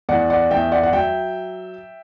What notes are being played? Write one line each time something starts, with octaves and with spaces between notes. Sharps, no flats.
E2 D5 F#5
D5 F#5
E2 E5 G5
D5 F#5
F#5
F#3 E5 G5